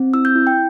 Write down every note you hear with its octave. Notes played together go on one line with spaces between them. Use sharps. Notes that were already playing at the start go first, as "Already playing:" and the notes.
Already playing: C4
E4 E6
G6
E4
G5